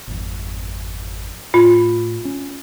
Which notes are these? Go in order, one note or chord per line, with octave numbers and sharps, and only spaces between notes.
G#1 F2
A2 F4
C#4